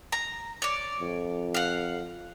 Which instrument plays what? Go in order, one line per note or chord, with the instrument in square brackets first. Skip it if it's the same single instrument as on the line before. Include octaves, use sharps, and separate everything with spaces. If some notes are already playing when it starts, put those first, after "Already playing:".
[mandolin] A#5
C#5 D5
[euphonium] F2
[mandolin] F5 F#5